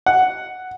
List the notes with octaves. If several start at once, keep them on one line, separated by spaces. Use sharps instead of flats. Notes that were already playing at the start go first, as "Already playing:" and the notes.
F#5